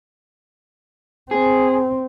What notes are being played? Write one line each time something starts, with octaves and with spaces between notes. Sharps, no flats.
C4 G#4